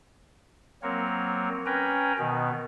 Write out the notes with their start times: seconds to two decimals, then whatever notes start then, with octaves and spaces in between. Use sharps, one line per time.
0.83 F#3 A#3 C4 A#4 C#5
1.66 C#4 A#4 B4 G5 G#5 A#5
2.19 B2 D#3 B3